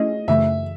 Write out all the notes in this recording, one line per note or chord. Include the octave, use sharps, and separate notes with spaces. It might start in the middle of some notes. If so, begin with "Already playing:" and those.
Already playing: A3 C#4 E4 G#4 D#5
F#2 C#3 E3 A3 E5